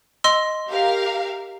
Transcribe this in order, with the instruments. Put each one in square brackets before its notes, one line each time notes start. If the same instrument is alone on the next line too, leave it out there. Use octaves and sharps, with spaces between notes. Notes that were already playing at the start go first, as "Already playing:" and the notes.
[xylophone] D#5 C6 E6
[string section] G4 A#4 F5